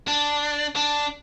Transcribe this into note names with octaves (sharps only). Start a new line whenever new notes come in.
D4
D4